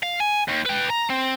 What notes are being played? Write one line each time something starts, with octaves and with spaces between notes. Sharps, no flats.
F5
G#5
D#2
B4 G5
A#5
C4